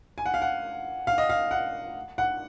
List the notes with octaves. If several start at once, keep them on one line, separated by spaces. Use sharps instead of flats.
G#5
F#5
F5
F#5
F5
D#5
F5
F#5
F#5